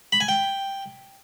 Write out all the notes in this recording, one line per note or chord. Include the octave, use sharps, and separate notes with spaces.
B5
G#5
G5